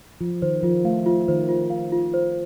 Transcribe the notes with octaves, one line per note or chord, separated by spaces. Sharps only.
F3 F4
D#3 C5
F3 F4
A3 F5
F4
D#3 C5
F4
F5
F4
C5